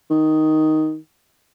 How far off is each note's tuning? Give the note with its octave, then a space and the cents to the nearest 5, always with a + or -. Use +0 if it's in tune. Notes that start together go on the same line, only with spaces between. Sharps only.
D#3 +5